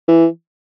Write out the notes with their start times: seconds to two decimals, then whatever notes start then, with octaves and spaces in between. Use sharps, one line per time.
0.08 E3